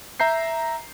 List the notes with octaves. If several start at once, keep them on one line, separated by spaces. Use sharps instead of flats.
E5 A#5 G6 C7